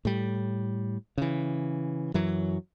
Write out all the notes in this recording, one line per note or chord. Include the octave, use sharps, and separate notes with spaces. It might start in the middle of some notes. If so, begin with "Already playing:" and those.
A2 G3
C#3 E3
F#2 E3 F#3